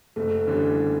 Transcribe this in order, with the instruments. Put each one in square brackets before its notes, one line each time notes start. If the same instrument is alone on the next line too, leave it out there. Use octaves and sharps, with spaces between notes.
[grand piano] F#1 [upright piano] A3
[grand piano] E2 D3 G3 C#4